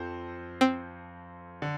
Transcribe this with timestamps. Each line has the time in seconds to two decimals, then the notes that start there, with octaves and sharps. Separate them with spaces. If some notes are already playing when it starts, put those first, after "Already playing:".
Already playing: F2 F3 C4 A4 C5
0.61 C4
1.62 D3